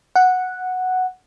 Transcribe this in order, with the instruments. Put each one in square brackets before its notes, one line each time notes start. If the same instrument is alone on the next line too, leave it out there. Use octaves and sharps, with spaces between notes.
[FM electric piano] F#5